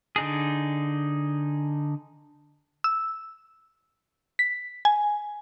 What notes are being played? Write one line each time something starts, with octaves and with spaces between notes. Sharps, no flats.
D3 D#4 G#4
E6
B6
G#5